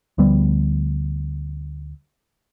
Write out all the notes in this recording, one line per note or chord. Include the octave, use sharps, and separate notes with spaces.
D2 F3 G3 B3